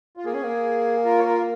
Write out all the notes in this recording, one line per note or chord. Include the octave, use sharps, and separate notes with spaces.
F4
A#3 G#4
C#4
A#3
F4 A#4
C#5
F4 A#4